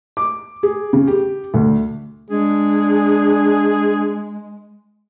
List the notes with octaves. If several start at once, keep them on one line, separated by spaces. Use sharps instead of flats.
D6
G#4
C#3
G4
D2
G#3 D4 G#4